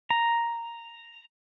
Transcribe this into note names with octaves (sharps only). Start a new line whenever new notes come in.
A#5